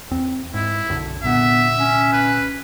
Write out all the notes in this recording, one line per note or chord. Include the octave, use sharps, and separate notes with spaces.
E2 C4
G#2 E4
B1 F#2 D3
C2 A#2 D3 B3 E5
C#4
B4